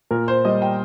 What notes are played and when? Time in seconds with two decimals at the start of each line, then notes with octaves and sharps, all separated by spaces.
0.11 A#2 A#4
0.28 C5
0.45 G3 D#5
0.62 G5